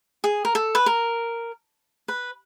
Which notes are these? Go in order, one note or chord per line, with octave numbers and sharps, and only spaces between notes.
G#4
A#4
A4
B4
A#4
B4